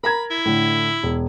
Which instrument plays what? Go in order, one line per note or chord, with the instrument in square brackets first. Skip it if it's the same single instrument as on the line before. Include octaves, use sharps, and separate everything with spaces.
[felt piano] A#4 A#5 G#6 [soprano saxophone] B5
[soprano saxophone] E4
[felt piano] A2 D3
E1